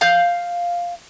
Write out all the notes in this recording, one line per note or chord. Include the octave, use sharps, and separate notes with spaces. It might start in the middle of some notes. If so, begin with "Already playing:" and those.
F5 G6